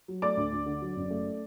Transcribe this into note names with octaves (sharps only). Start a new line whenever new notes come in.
F#3
A3 D5 D6
D2
D2
D3
F#3
F#1
A3